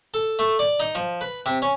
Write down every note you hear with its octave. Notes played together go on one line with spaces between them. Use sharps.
A4
A3
D5
D#4
F3
B4
C3
C#4